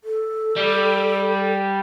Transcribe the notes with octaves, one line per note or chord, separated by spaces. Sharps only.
A4
G3